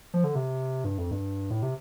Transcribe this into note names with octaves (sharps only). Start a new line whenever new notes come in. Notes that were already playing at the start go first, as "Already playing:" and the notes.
F3
D3
C3
G2
F2
G2
A2
C3